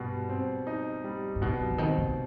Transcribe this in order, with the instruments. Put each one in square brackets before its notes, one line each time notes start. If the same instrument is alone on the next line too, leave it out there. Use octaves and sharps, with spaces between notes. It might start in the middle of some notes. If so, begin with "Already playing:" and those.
Already playing: [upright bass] G2 [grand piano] B2 G3
[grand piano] C4
D#4
G3
[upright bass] G#2
[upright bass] G2 [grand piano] B2
[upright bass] F3
D3
[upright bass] D#3 [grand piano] C4
[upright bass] C3